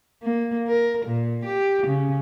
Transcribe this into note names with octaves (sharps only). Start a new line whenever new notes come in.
A#3
A#4
A#2
G4
C#3